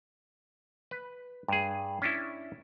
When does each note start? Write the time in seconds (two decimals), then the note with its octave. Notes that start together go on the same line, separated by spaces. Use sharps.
0.91 B4
1.48 G2 G#4
2.02 C#4 D4 E4